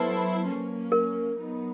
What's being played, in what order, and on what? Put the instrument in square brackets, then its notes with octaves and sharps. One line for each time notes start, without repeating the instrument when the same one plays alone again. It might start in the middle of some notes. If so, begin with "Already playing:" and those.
Already playing: [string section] F#3 B3 E4 A4 C5 [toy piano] B4
[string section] F#3 A#3 C#4
[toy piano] A#4
[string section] F#3 B3 D#4